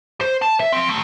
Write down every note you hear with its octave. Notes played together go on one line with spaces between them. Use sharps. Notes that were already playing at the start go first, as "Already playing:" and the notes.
C5
A5
E5
F3 C4
D#3 A3